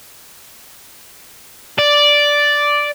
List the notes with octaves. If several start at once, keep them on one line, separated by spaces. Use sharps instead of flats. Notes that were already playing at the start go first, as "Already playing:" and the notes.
D5